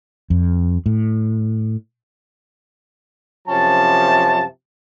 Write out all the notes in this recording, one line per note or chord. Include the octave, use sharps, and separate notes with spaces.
F2
A2
F#2 C3 F3 C#4 A5